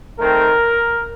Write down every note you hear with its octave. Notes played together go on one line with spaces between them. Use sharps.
D#3 A3 C4 A#4